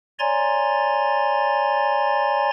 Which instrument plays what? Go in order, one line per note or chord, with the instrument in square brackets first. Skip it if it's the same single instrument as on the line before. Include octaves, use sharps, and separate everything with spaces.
[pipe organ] C#5 D5 G#5 A#5 C6 A6